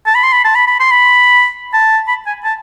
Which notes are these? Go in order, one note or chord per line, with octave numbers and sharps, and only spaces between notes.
A5
B5
C6
B5
A5
B5
B5
C6
B5
A5
B5
G#5
A5